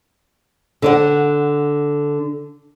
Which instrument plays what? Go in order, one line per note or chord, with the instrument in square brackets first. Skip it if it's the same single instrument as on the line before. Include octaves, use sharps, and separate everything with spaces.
[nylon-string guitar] D3 D5 F#5